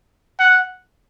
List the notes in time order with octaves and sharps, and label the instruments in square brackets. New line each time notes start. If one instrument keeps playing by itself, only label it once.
[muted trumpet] F#5